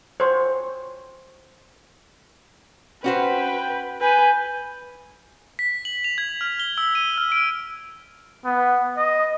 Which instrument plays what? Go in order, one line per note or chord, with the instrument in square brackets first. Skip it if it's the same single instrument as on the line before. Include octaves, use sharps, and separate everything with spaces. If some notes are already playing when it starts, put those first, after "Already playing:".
[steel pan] C5 C#5
[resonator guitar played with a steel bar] C#4 F#4 C5 [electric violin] B4 [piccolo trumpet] G5
[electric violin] B4 [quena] G#5 [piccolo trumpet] G6
[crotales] B6
F#7
F7
G#6
F6
G7
E6
D#7
F6
D7
[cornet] B3
D#5